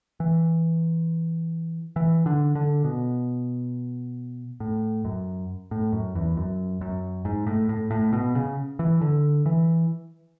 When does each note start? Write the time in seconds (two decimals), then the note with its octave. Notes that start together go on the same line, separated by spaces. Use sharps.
0.20 E3
1.96 E3
2.26 D3
2.55 D3
2.84 B2
4.60 A2
5.05 F#2
5.71 A2
5.92 F#2
6.15 E2
6.37 F#2
6.81 F#2
7.25 G#2
7.47 A2
7.69 A2
7.91 A2
8.13 B2
8.35 C#3
8.79 E3
9.01 D3
9.46 E3